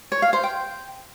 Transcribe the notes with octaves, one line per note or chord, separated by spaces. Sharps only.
C#5
F5
C5
G5